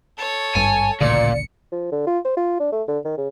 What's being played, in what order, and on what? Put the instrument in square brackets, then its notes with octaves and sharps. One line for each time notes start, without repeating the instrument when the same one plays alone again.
[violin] A4 C#5
[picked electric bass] G#1 G2 [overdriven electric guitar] G#5 [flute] A5
[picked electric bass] A1 D2 C#3 [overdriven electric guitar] A#2 [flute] D5 [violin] C#7
[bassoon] F3
D3
F4
C5
F4
D4
A3
D3
D#3
C#3